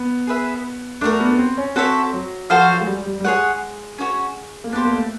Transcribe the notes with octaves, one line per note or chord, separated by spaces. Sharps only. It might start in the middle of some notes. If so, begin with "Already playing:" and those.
Already playing: B3
G#4 B4 E5
A3 D4 F#4 A#4
B3
C4
C#4
C4 F#4 A4 C#5 E5
F#3
F3 F#4 A4 C5 F5
F#3
G#3
G3
G3
G3
G#3 G#4 C#5 F#5
C#4 F#4 A4 C#5
A#3
B3 D4 G4 C5
A#3
A3